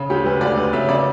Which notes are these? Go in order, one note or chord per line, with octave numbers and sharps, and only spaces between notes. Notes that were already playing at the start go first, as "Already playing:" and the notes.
Already playing: C#3
D2 G4
D2 B4
D2 D5
D2 B4
C#3 E5
C#3 D5